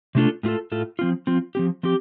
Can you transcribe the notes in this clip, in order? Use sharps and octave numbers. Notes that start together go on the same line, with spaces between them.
C3 A3 D4 F4 A4
A2 A3 F4 A4
A2 A3 F4 A4
F3 C4 F4
F3 C4 F4
F3 C4 G4
F3 C4 G4